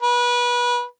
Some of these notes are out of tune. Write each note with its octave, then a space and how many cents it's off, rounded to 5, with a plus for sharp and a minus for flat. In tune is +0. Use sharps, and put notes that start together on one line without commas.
B4 -25